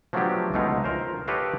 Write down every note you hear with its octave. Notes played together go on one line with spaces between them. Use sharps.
F3 F#3 A3 B3 D4 G4
C#2 B2 G#3 A3 D#4 F5
F4 A#4 C5
G4 A4 B4 C#5 D#5 F5